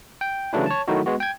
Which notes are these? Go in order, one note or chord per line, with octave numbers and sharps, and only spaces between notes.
G5
C#3 E3 F#3 A3 D4 E4
C#5 A5
D#3 F#3 A3 D#4 E4 F#4
G#3 B3 F#4
G5 G#6